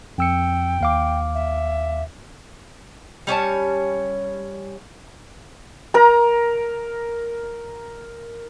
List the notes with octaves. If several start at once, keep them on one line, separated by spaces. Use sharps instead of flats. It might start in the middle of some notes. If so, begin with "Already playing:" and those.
F2 G5 E6 C#7
D#2 F5 D6
E5
G3 C#4 C#5 A5
A#4 A#5